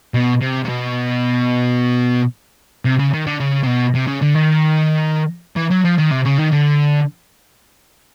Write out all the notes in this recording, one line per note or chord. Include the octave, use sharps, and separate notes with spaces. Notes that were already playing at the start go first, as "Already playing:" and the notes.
B2
C3
C3
B2
C3
C#3
D#3
D3
C#3
C3
B2
C3
C#3
D3
D#3
E3
F#3
F3
D#3
C3
C#3
D#3
D3